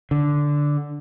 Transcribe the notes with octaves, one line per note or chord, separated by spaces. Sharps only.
D3